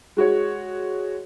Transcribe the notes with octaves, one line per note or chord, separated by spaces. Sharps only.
G#3 F#4 C#5